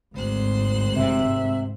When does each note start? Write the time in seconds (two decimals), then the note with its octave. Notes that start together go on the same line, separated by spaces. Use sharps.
0.14 G#1 D2 C5 F#6
0.97 C3 E5